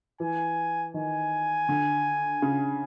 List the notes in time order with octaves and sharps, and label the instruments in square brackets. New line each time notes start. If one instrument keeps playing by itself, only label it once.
[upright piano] E3 [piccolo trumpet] G#5
[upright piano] D#3 [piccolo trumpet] G#5
[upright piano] D3
C#3